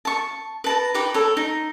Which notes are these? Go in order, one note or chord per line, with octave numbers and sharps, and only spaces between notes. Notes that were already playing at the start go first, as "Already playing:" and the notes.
A5 C#6
B4 A5 A#5
D#4 G4 B4 D6
A4 C#5
D#4